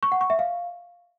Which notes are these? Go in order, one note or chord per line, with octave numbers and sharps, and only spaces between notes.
C#6
F#5
C#6
E5
F5